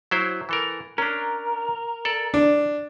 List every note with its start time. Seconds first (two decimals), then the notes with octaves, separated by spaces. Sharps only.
0.11 F#3 E4 C5
0.49 E3 A4 A#4
0.98 C#4 D4 A#4
2.05 A4 D5
2.34 D4